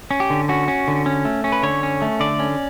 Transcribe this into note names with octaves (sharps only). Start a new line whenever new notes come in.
C#4
G4
D3
C#4 F#4
C#4
D3
C#4
A3
C#4
B4
D3 C#5
C#4
A3
D3 D5
C#4